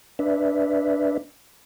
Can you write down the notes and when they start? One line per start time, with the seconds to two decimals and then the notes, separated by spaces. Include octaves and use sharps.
0.19 D4 B4 D5 E5